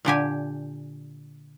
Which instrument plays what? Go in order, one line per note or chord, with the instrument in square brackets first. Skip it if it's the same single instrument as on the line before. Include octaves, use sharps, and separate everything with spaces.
[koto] A#2 D3 G4 G#5